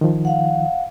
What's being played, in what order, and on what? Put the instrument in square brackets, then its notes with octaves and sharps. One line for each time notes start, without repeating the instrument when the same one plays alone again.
[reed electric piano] D#3 F3
[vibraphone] F5 F#5